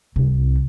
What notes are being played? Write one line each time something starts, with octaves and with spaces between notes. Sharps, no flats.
C2